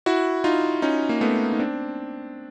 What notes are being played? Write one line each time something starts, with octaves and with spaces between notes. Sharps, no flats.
E4 F#4
D#4 F4
C#4 D#4
A#3
A3 B3
D#4
C4 D4